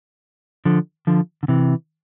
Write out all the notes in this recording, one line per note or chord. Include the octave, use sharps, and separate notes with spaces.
D3 F3
D3 F3
D3
C3 E3